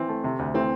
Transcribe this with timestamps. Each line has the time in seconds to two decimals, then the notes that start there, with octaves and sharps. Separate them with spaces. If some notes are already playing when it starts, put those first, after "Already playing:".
Already playing: E3 C4
0.09 A3
0.24 C3
0.39 D2
0.54 E3 A3 C4